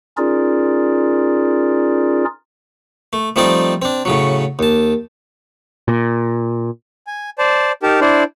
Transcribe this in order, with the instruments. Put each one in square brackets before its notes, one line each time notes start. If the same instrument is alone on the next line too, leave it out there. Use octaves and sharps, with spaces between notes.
[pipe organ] C#4 D#4 F4 G#4 A#4 D5
[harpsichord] A3
F3 G3 A3 C4 D#4 D5
C4 D4
A2 C#3 F#3
D#2 A5
[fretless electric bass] A#2
[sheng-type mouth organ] G#5
C5 D5 A5
D#4 G4 A#4 A5
D4 E4 C5 D5